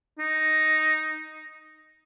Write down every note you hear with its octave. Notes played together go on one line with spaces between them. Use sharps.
D#4